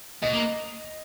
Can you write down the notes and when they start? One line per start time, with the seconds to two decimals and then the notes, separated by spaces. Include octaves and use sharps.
0.22 B2 D#5
0.33 A#3